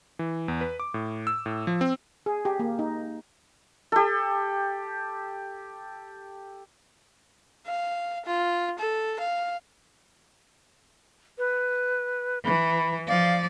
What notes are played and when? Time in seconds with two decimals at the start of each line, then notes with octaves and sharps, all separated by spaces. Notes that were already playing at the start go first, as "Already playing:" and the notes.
0.19 E3
0.48 E2
0.61 B4
0.80 D6
0.94 A2
1.27 E6
1.46 A2
1.67 F3
1.81 C4
2.26 G#4
2.45 G4
2.59 A#3
2.79 D#4
3.92 G4 A4
7.66 F5
8.26 F4
8.79 A4
9.20 F5
11.38 B4
12.45 E3 B5
13.08 F3 D5 F5